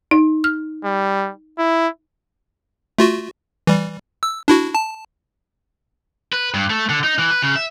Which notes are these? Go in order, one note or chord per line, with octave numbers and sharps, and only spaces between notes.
D#4
F6
G3
E4
A3 F4 F#4
E3 G3
E6
D4 E4 F#4
A5
B4
G2
A3
D3
D#4
E3
B4
C#3
E5